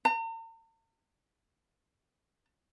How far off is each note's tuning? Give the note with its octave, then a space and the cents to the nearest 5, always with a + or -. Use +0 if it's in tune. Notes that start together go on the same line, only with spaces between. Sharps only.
A#5 -45